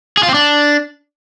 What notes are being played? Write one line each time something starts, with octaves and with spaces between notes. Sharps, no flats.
G#4
F4
C4
D4